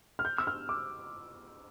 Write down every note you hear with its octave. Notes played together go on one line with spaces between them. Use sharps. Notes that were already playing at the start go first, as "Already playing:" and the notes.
F6
G6
E6
F6
D6